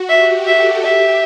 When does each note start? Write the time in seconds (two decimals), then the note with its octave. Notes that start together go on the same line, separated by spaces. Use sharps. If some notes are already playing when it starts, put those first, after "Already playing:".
Already playing: F#4
0.09 G4 E5
0.47 A4 E5
0.84 G4 E5